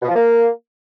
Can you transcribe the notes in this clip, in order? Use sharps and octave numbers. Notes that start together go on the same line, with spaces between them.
B2
F3
A#3